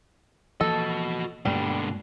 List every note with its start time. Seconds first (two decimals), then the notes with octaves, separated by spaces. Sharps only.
0.61 E3 F3 A#3 F#4 A4 D#5
1.45 G2 B2 D3 G3 G#3 A#3